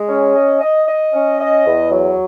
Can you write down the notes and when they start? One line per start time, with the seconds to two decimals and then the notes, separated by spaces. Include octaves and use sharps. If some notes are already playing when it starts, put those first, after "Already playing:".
Already playing: G#3
0.09 C#4
0.36 D#5
0.61 D#5
0.88 D#5
1.13 C#4
1.40 D#5
1.66 E2
1.92 F#3